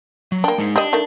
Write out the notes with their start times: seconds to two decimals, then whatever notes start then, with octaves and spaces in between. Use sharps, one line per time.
0.32 F#3
0.44 A#3 D4 G5
0.58 G#3 D#4
0.76 D4 G4 D#5
0.93 D#3 A3